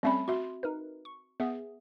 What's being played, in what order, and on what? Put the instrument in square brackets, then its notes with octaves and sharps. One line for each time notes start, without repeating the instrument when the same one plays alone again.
[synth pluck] G3 A3 C#4 [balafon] C4 E5 B5
[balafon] F#4 E5 [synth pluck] C6
[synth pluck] D#4 A#4 B4
C#6
[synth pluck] B3 G#4 [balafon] E5